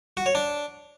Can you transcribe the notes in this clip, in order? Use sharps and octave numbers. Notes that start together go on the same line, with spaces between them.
F#4
C#5
D4